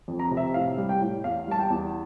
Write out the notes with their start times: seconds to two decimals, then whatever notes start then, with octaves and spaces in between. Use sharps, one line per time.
0.08 F2
0.19 A#5
0.31 C3
0.37 E5
0.54 A2 F5
0.78 G3
0.89 G5
1.01 A2
1.24 E2 F5
1.47 G3 A5
1.59 G5
1.70 E2